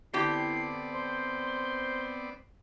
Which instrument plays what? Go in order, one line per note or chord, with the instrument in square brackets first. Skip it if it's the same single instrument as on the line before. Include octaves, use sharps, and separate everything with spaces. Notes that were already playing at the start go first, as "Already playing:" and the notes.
[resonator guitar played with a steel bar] D3 G4 G5 [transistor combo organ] B3 C4 D5 [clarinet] E4 [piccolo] C7
[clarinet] C5 [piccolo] C6